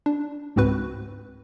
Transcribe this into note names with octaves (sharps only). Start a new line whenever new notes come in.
D4
C#2 G#2 C4 F#4 B4